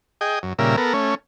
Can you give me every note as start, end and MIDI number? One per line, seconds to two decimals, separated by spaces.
0.21 0.39 68
0.21 0.39 75
0.21 0.39 79
0.43 0.53 42
0.59 0.76 46
0.59 0.76 49
0.59 0.76 55
0.59 0.76 70
0.59 0.76 76
0.77 0.93 59
0.77 0.93 69
0.77 0.93 70
0.94 1.15 57
0.94 1.15 61